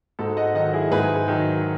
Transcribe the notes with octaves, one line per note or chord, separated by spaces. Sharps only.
G#2 F#4 A4
D#5 F#5
D#3 F#3 D#5 F#5
E4 G#4
G#2 G#4 B4
D#3 F#3